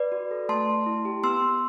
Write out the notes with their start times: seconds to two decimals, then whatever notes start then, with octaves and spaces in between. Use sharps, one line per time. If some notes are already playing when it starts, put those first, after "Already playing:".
Already playing: B4 D5
0.12 F#4
0.31 A4
0.49 A3 A5 C6
0.68 A3
0.86 E4
1.05 G4
1.23 B3 C6 E6
1.42 B3